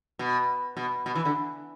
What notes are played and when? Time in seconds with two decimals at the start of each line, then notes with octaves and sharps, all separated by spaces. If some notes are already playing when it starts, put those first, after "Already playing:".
0.19 B2
0.77 B2
1.06 B2
1.15 E3
1.25 D3